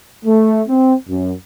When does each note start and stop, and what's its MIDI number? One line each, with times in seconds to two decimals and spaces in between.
0.25 0.62 57
0.68 0.93 60
1.08 1.33 42